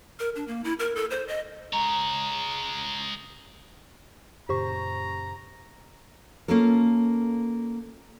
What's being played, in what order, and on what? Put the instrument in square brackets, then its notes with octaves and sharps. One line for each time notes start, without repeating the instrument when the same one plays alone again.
[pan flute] A#4
D4
A#3
E4
A#4
A4
C5
D#5
[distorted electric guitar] G#3 C#5 [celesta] A#5
[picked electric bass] F#2 A#2 C#3 [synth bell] G4 C5 C#6 [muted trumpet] A#5
[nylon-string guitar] A#3 C#4 F4 A4 A#4